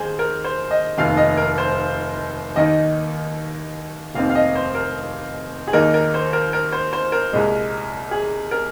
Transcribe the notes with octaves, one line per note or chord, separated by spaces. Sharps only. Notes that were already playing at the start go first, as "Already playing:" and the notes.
Already playing: D#2 D#3 G#4 C5
A#4
C5
D#5
F1 D#2 D#3 F5
D#5
A#4
C5
D#2 D#3 A#3 D#4 D#5
F1 D#2 D#3 C4 F5
F5
D#5
C5
A#4
G#4
D#2 D#3 A#3 D#4 A#4
A#4
C5
A#4
A#4
C5
C5
A#4
C2 A#2 G#3
G#4
A#4